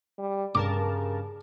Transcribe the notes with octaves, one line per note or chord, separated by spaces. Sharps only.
G3
G2 C#3 A#4 A5 D6